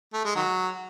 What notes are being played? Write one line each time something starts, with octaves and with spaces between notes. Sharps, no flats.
A3
G#3
D#3 F#3